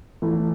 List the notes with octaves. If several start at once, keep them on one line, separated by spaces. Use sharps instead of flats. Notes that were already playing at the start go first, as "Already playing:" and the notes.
E3 A3